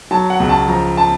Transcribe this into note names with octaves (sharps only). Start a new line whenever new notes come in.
F#3 A5
F#5
C#2
A5
F3 A#5
A5